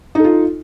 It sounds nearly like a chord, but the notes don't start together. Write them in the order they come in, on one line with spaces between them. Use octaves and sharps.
D#4 A4 F4